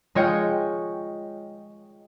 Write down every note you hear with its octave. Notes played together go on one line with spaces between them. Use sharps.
G#3 F4 C#5 D#5 G5 C#7